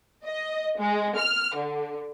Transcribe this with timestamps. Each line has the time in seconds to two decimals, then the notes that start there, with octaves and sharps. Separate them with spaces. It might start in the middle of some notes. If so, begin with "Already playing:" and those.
0.25 D#5
0.79 G#3
1.18 F6
1.55 D3